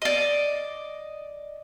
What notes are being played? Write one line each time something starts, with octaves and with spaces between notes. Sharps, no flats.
D5 D#5